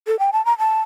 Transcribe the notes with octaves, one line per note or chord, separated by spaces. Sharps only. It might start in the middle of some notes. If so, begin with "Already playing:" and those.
A4
G5
A5
A#5
A5